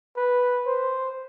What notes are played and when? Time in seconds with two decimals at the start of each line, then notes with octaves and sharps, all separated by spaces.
0.17 B4
0.66 C5